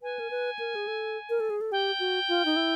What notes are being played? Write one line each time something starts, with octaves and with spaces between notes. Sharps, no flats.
B4 G#5
A#4
B4
A#4
G#4
A4
A#4
A4
G#4
A4
G4 G5
F#4
F4
D#4
E4